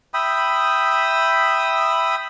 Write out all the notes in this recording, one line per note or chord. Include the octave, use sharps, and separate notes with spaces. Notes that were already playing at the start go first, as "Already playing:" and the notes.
E5 G5 B5 D#6